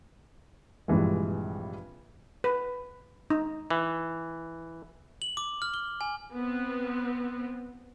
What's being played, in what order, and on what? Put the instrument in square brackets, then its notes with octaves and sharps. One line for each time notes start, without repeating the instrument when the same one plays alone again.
[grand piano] A#1 G2 C3 E3 G#3
[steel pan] B4
D#4
[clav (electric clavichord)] E3
[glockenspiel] F#7
D6
F6
G7
G#5
[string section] B3 C4